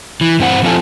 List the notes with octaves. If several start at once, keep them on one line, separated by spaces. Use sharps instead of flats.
E3
G2 C4 C5 F#5
F3 C4 F4 A4 G#5 A5